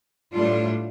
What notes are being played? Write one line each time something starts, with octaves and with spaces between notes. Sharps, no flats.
A2 G3 D4 F4